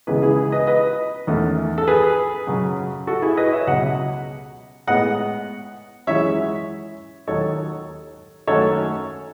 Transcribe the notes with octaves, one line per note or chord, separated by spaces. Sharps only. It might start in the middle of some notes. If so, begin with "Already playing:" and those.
C#2 C#3 E3 G#3 B3 G#4 B4
E4 G#4
B4 D#5
B4 D#5
E2 D#3 A3 C#4
A4
G#4 B4
F#2 C#3 F#3
F#4 A4
E4 G#4
B4 D#5
C#5 E5
C#2 B2 F#3 D#5 F#5
A2 G#3 B3 D#5 F#5
F#2 E3 G#3 C#5 E5
D#2 D#3 F#3 A4 C#5
F#2 D#3 F#3 A3 C#4 A4 C#5